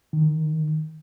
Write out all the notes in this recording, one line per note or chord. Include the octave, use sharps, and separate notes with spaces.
D#3